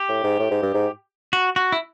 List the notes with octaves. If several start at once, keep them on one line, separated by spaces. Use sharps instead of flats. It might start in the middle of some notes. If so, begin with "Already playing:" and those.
Already playing: G4
A2
G#2
A2
G#2
G2
G#2
F#4
F#4
E4